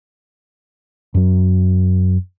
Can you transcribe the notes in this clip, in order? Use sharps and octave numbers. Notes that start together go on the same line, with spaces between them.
F#2 F#3